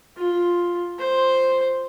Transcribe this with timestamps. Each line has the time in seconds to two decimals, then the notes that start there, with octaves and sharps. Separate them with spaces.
0.17 F4
0.99 C5